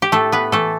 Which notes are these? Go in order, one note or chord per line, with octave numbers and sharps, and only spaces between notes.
G4
A2 A3 A4
B3 B4
E3 A3 A4